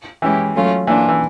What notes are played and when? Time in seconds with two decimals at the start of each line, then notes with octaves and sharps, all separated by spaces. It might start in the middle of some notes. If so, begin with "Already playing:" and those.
0.22 E3 G#3 C#4 E4 G4
0.54 F#3 A3 C#4 F4
0.87 E3 A#3 D4 F4
1.09 E3